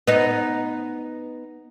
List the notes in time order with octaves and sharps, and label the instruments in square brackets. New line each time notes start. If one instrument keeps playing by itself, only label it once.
[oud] B3 D#4